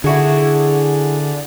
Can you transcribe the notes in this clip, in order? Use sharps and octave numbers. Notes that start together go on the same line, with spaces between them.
D3 E4 F#4 G#4